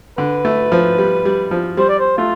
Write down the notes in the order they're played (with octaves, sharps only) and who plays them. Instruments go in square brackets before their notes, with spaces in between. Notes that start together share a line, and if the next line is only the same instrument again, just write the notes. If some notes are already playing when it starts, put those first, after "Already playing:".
[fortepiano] D3 [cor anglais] B4
[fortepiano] A3
F3
G3
G3
F3
[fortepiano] G3 [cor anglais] C5
[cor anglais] D5
C5
[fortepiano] A3 [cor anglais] F4